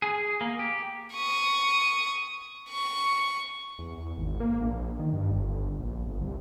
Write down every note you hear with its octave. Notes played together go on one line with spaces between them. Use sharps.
G#4
A#3
G4
C#6 D#6
C#6
E2
E2
G#1
A#3
A#1
D#3
G2
G1
A#1
G1
C2